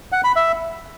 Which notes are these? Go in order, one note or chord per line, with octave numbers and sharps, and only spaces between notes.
F#5
B5
E5